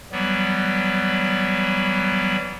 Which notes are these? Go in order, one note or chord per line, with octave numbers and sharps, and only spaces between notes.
E3 F#3 G3 B3